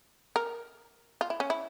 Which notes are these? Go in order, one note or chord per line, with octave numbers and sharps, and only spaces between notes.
A#4
F4
E4
C#4
E4